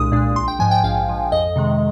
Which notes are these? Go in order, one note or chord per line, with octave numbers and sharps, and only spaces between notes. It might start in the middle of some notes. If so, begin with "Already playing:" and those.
Already playing: C2 A#2 G#3 D4 D#6
A#2 G#3 D4
A#1 C6
G5
G#2 F3 G#5
G5
A#1 F5
G#2 F3
F2 D#5
C3 D#3 G#3